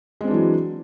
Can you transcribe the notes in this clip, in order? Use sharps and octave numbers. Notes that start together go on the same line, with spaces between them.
E3 F#3 G#3 C4 D4